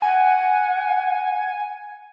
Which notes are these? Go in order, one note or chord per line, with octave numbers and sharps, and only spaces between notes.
F#5 G#5